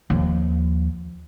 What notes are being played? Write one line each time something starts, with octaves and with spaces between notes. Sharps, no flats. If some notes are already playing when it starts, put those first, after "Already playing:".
D#2 F3